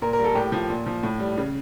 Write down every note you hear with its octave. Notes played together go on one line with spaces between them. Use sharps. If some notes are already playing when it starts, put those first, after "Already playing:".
A#2 A#4
A#4
G3 A4
A2 G4
F3
A#2
F3
A2
G3
C#3